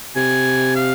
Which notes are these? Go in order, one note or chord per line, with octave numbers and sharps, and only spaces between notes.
C3 G#5
F5